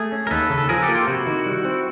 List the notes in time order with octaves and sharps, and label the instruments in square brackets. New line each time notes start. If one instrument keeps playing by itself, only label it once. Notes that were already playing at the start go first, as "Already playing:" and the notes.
Already playing: [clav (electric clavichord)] A3 [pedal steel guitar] G#4
[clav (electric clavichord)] C#4
[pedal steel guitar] A#4
[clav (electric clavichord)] D#2 [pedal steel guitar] A4 B4
[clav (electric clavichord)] C#3
[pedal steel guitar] A4
[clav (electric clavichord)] F3 [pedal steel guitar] G#4 A#4
[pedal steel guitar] G4 A4
[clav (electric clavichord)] A#3
[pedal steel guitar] F4 G4
[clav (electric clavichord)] C3 [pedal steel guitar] E4 F#4
[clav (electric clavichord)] D#3
G3
C4